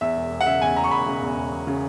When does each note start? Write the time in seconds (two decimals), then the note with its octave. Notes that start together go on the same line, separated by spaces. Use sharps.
0.01 E2 E5
0.16 E1
0.31 E1
0.41 F#5
0.46 C#3 E5
0.61 E2 G#5
0.76 E1 A#5
0.84 C#6
0.91 E1 B5
1.06 C#3
1.22 E2
1.36 E1
1.51 E1
1.67 C#3